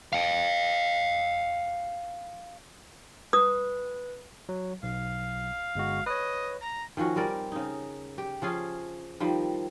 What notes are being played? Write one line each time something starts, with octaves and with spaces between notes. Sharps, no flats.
F5 G5
B4 D#6
F#3
B1 F5
G1 G#3 F#4
B4 C#5 D#5
A#5
D#3 F3 C#4 F#4
G3 C4 A#4 D5
C#3 D#4
G4
F3 C#4 F4 G#4
D#3 F3 G3